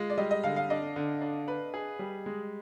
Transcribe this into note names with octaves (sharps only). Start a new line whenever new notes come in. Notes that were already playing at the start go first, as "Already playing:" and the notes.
Already playing: G#3 F4
D5
G3 D#5
D#5
D3 F5
F5
D4 D#5
D3
D4
B4
G#4
G3
G#3